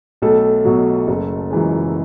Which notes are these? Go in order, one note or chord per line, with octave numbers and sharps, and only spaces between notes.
B1 A3 A4
B2 F#3
F#1
F#2 E3 G#3